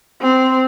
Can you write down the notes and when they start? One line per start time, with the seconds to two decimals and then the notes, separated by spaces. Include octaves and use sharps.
0.21 C4